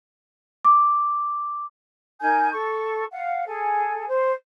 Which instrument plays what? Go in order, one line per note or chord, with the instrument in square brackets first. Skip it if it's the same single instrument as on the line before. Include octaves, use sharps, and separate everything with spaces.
[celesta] D6
[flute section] D#4 A#4 G#5 G6
A4 C#6
F5 F#5
G#4 A4 G#5
C5